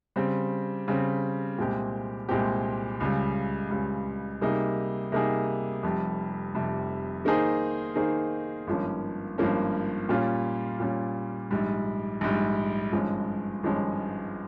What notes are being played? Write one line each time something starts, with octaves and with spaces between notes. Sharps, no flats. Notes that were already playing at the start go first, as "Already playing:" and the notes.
C#3 G3 C4
C#3 G3 C4
C2 A#2 G#3 C4 G4
C2 A#2 G#3 C4 G4
C#2 C#3 G3
C#2 C#3 G3
C3 G3 A#3 D#4 G#4
C3 G3 A#3 D#4 G#4
F1 F2 C3 G3
F1 F2 C3 G3
D#3 A#3 D#4 G#4 C5
D#3 A#3 D#4 G#4 C5
G#1 G2 F3 A#3 C#4
G#1 G2 F3 A#3 C#4
A#2 G3 C#4 F4
A#2 G3 C#4 F4
A#1 G#2 G3
A#1 G#2 G3
G#1 G2 F3 G#3 C#4
G#1 G2 F3 G#3 C#4